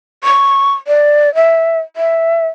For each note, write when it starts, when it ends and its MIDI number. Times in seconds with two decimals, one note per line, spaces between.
0.24 0.73 85
0.87 1.33 74
1.35 1.79 76
1.97 2.47 76